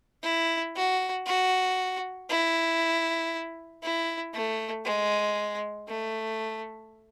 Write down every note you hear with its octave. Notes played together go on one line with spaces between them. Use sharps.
E4
F#4
F#4
E4
E4
A3
G#3
A3